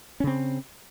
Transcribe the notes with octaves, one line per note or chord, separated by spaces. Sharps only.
C#3 C4 C#4